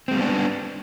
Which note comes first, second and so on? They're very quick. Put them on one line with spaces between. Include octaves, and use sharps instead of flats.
C4 G#3 G3 B3 D4